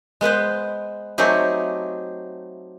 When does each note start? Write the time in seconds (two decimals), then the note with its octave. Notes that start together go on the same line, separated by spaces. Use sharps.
0.21 G#3 B3 B4 C5
1.18 F#3 A3 C4 D#4 G4 G#4